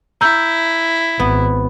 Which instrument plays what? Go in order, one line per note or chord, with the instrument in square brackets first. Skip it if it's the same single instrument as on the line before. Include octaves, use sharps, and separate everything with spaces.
[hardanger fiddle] E4 [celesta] A#5 E6 G6
[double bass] G#1 [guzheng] B3